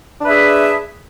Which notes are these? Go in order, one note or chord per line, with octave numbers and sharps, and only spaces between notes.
D4 G#4 B4 E5